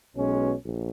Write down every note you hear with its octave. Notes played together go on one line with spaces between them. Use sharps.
B1 B2 G#3 C#4
A#1